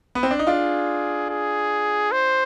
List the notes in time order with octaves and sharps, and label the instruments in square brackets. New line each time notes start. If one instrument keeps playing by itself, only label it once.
[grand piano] B3
C4
D4
D#4
[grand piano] D4 F4 [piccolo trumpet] G#4
[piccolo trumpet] G#4
C5